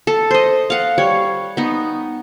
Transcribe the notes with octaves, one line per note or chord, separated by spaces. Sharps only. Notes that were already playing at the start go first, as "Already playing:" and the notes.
A4
C5 D#5
F5 F#5
G3 C#5
B3 D#4